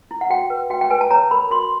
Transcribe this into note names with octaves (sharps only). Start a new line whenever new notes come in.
E4
F#5
F#4 G5
B4
F#4 G5
G5
B4 G#5
A5
C#5 A#5
A#4 B5
F#4 C6